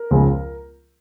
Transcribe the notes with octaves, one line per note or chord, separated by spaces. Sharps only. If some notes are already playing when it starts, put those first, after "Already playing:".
Already playing: A#4
C#2 C#3 F3 G#3